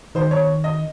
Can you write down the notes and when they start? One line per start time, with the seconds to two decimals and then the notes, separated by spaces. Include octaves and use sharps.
0.15 D#3 C5
0.31 C#5
0.64 D#5